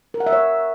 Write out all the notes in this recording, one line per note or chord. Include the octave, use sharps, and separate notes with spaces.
A#4
F#5
E5
C#5